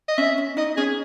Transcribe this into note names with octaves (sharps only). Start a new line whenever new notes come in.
D#5
C#4 E5
C#4
D#4 D#5
C#4 G#4